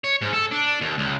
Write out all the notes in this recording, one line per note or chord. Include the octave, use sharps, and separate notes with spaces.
C#5
G#2
A4
D4
D#2
C#2